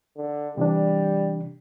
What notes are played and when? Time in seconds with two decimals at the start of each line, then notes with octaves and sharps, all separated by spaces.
0.17 D3
0.57 C3 E3 G3 D4